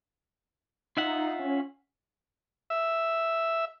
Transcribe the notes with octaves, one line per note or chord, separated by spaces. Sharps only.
D#4 F4 E5 F#5
C#4
E5